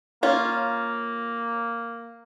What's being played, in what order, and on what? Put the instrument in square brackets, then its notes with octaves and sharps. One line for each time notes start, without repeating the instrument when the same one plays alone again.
[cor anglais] A#3 [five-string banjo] C#4 F4